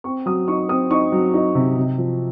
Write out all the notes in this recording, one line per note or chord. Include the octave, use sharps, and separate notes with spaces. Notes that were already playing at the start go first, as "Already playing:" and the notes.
C4 C#6
F#3 D#6
D#4 C#6
C4 D#6
D#4 C#6
F#3
D#4
C3
C3
F3